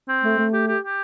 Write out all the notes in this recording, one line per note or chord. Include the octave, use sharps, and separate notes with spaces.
C4
A3
A3
G4
G4
G4